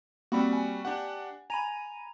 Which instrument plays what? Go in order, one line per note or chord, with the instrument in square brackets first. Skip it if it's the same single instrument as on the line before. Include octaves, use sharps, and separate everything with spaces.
[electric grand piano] G3 F#4 [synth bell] A#3 C4 B5
[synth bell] G#5
[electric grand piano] D4 G4 F#5
[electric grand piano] G#5 A#5 [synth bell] B5 D#7 F7